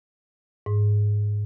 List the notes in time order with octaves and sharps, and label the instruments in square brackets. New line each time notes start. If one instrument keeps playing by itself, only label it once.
[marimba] G#2